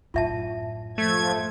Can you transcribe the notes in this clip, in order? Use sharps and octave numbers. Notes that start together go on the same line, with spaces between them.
F#2 A2 F4 E5 A5
F3 A3 G#6